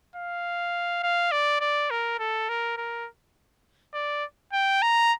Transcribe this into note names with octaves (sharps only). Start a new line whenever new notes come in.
F5
F5
D5
D5
A#4
A4
A#4
A#4
D5
G5
A#5